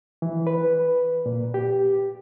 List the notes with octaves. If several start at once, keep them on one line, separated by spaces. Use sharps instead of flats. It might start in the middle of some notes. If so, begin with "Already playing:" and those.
E3
B4
A#2
G4